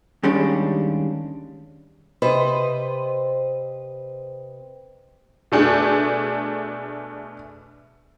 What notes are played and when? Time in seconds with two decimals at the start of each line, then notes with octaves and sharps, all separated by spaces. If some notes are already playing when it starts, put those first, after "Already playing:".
0.23 D#2 G3 G#3 C#4 D4
2.22 C3 B4 C5 D#5
5.52 B2 A3 D4 G#4